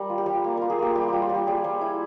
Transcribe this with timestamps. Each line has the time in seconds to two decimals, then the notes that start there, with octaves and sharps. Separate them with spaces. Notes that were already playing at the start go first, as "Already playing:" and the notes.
Already playing: G3 A#4
0.10 F4
0.18 G4
0.26 G3
0.44 A#3
0.57 F4 A#4
0.70 G#4
0.79 A#3 G4
0.95 G3 G4
1.08 G3 F4
1.22 F4
1.29 G3
1.34 G4
1.47 G3 G#4
1.64 G3
1.81 E4